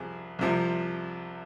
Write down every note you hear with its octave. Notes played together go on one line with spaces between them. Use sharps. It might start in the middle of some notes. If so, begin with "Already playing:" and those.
Already playing: C2 C3 F3 G#4
C2 C3 F3